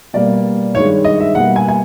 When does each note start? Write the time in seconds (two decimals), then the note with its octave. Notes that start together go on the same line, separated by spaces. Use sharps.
0.14 B2 G3 A#3 D5
0.74 G2 D#3 G#3 C#5
1.04 D#5
1.20 E5
1.35 B2 G3 A#3 F#5
1.56 G#5
1.68 G#5